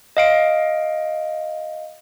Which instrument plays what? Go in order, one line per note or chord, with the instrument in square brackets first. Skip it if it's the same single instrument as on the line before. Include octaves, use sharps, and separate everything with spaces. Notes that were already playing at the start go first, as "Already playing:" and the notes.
[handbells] D#5 F5 D7